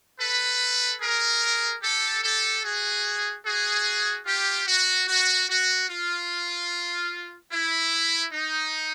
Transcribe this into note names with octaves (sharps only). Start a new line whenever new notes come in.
A4 B4
G#4 A#4
G4 A4
G4 A4
F#4 G#4
F#4 G#4
F4 G4
F#4
F#4
F#4
F4
E4
D#4